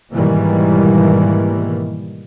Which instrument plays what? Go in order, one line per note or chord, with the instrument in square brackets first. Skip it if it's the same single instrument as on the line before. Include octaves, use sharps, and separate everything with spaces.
[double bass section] G#2 B2 D#3 E3 G3 A#3